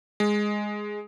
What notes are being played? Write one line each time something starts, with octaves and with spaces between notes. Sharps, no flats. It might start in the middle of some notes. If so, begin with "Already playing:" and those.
G#3